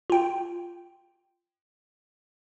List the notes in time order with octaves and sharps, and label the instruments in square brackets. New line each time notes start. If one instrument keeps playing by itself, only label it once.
[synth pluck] F4 G5